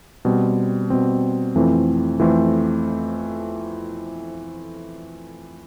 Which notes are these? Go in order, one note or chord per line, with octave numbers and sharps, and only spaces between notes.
B2 G3 C4
B2 G3 C4
F2 E3 A3 C4 F4
F2 E3 A3 C4 F4